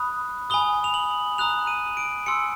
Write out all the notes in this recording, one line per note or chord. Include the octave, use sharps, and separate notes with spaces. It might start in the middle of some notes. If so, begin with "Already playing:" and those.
Already playing: B5 D#6 F#6
G#5 B5 D#6 G7
F7
F#7
A#5 D#6 F#6 F7
D#7
D7
G#5 C6 E6 C#7